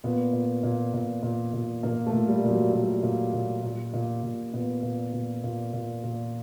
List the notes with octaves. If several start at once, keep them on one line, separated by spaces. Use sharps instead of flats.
A#2 B3
A#2
A#2
A#2
A#2
A#2
A#2 A#3
A3
A#2
G3
A#2
F#3
A#2 G3
A#2
A#2
A#2
A#2
A#2
A#2 B3
A#2
A#2
A#2
A#2
A#2